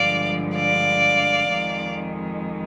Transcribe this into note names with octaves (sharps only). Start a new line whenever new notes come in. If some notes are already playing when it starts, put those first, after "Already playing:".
Already playing: G2 D3 F3 G#3 D5 F5
D5 F5
F2 D#3 G#3